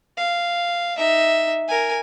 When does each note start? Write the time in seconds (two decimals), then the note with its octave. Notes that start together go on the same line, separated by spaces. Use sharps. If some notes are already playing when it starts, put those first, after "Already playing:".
0.17 F5
0.97 D#4 E5
1.68 A#4 G#5